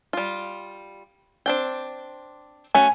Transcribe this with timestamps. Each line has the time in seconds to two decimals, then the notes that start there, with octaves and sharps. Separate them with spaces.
0.13 G3 F4
1.46 C4 D4 G5
2.75 A3 C#4 F#4 G#5